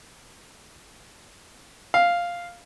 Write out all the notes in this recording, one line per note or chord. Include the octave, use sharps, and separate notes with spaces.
F5